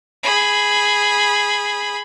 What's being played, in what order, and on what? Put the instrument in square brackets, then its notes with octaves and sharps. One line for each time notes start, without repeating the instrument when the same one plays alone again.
[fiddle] G#4 B5